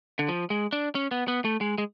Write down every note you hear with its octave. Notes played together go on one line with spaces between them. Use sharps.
D3
F3
G#3
D4
C#4
B3
B3
A3
G#3
G#3